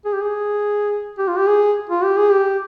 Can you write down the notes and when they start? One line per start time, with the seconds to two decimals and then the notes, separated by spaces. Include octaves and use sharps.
0.05 G#4
0.13 G4
0.21 G#4
1.19 G4
1.28 F4
1.38 G4
1.47 G#4
1.90 F4
2.04 G4
2.18 G#4
2.32 G4